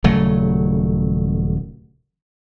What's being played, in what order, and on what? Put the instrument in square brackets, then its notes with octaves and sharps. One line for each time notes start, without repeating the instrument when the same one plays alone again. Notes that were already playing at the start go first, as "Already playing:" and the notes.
[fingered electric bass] D#1 C#3 F#3 A3